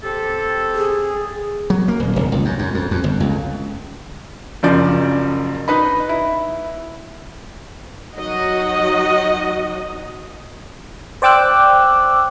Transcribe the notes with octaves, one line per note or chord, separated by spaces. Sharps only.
C4 G4 A4
G#4
F#3
A#3
D#1
E1
C#2
F#2
F#2
F2
F2
G1
C#2
F#1 F#2 C#3 F3 D5 G6
D#4 B4 D#5 B5
E4
F#3 D#4 F#4 D#5 F#5
C5 D5 G5 D6 E6 F#6